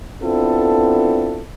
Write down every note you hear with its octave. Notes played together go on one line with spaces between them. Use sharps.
B3 C4 D4 E4 F4 A4